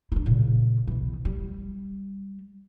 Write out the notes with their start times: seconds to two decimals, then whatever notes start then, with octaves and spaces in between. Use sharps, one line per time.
0.12 D4 E4
0.26 A#2 C#3
0.87 B1 E3
1.25 G3